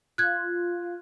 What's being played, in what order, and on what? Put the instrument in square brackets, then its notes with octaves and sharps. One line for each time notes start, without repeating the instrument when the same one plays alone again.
[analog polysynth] F4 [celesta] F#6 G#6